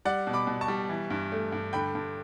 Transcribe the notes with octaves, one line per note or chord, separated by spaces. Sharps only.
G3 D5 F#5
B2
B5 D6
B2
A5 C#6
G3
E3
G2
A3
G2
D3 G5 B5
G2